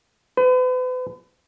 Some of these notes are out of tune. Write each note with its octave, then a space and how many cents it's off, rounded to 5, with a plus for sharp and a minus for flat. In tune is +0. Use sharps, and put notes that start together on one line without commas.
B4 +40